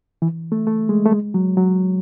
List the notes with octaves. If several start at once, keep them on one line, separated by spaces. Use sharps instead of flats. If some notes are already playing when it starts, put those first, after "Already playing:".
E3
A3
A3
G#3
A3
G#3
F#3
F#3